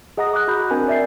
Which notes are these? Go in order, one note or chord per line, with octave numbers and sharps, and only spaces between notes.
G#4 D#5 F#5 A#5 D#6 A#6
D6 F#6
F#4 A#5 B5 G6
C4 D4 A#4 G#5
D5 E5 G6 A6 C7